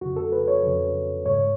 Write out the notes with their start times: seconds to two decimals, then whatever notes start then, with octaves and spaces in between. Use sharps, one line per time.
0.01 F2 C#3 F#4
0.16 A4
0.32 B4
0.48 C#5
0.63 F2 C#3
1.26 G#2 C#5